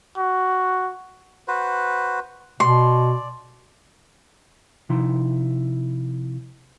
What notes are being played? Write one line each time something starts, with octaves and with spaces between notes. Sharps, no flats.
F#4
F#4 B4 C5
B2 D5 C6
C3 F3 D#4 E4 C6